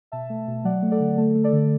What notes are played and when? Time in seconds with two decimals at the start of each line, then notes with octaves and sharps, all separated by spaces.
0.12 B2 E5 A5
0.30 A3
0.48 B2
0.64 F#3 D5 F#5
0.82 A3
0.92 A4 D5
1.00 D3
1.18 A3 A4
1.35 A3
1.44 A4 D5
1.53 D3